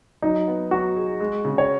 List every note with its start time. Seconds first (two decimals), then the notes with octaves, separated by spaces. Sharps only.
0.22 F#3 D#4
0.48 B3
0.71 F#3 F#4
0.96 G#4
1.20 G#3
1.45 C#3
1.58 C#5